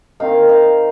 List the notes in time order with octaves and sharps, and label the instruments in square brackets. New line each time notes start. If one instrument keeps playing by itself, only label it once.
[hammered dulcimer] D#3 C4 D#4 F5
F5